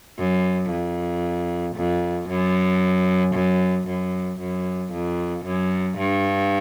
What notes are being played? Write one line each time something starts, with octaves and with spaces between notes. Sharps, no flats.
F#2
F2
F2
F#2
F#2
F#2
F#2
F2
F#2
G2